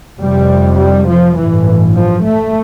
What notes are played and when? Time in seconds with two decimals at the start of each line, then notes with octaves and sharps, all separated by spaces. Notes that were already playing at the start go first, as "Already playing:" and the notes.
0.19 F1 F2 C3 G3
0.78 G3
1.08 F3
1.37 A1 G2 E3
1.95 F3
2.24 A3